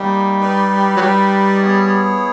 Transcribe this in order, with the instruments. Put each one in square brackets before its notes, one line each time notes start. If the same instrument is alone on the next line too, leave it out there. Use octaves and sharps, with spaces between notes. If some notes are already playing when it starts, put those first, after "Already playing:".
Already playing: [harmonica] G3 [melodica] A#3 D#4 G4
[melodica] D#4 G4 B4 D5
[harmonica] F#3
G3
[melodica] B3 E4 G#4 C#5